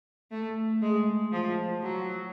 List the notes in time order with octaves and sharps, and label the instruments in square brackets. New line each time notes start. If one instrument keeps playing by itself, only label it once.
[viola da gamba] A3
G#3
F3
F#3